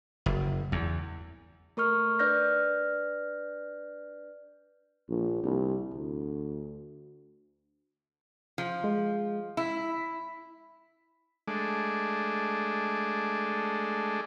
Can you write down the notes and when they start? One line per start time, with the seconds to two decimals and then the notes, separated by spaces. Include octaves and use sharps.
0.26 F#1
0.72 E2
1.77 A3 A#4 C#6 F6
2.19 D4 B4 D5 F6 G6 A#6
5.09 A#1
5.43 C2
5.94 D2
8.58 F3
8.84 G#3
9.57 E4 B6
11.47 G#3 A3 D4